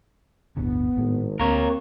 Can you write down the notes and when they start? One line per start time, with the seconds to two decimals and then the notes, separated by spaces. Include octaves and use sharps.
0.57 D1 G1 D3 B3
0.98 G#1 A2
1.39 D2 A#3 C4 A#4 C#5